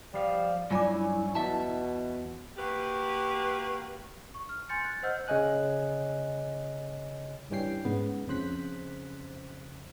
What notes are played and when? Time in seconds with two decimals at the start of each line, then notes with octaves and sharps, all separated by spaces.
0.14 F3 G3 F5
0.71 G2 F#3 C#4 E4 F4 D5 G#5 D6
1.35 E2 B2 E5 A5
2.57 A#3 F#4 G4 B4
4.34 C#6
4.49 F6
4.69 G#5 C6 G6 A6 C#7
4.84 F#6 A6
5.03 C5 D#5 F#5 E6 F6 G6
5.28 C#3 C#5 D#5 G#5 F#6
7.50 G2 E3 G3 C#4 G5 C7
7.85 G#2 C#3 B3
8.27 F2 C#3 C5 F#6 B6